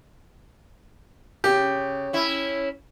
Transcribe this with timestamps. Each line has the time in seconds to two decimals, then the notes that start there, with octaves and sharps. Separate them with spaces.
1.44 C#3 G4
2.13 C#4 E4